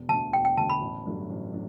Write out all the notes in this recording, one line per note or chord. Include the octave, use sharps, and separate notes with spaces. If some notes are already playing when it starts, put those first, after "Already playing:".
Already playing: E1
D2 D3 A5
E1 G5
G5
D2 D3 A5
B5
A1
G2 F#3 A3 D4
A1
F#3 A3 D4